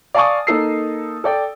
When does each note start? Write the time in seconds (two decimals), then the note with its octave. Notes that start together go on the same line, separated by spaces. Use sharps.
0.14 D5 F5 G#5 A5 C#6 D#6
0.47 A#3 D#4 A4 E6 C7
1.24 A4 D5 G5